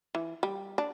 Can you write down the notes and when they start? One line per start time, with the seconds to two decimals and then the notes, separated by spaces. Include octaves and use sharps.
0.15 E3
0.43 G3
0.78 D4